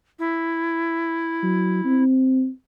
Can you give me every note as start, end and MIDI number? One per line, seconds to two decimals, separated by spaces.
0.19 2.03 64
1.43 1.84 54
1.85 2.49 60